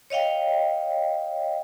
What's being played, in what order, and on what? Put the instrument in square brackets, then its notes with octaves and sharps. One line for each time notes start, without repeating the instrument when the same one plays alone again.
[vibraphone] C#5 D#5 F5 G5